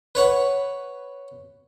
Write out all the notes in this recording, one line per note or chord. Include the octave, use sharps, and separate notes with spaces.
B4 C#5 F#5